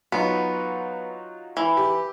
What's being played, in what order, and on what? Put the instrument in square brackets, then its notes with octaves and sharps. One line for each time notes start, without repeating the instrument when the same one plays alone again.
[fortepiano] F#3 D#4 F4 [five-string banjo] B3
[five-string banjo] E3
[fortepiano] G4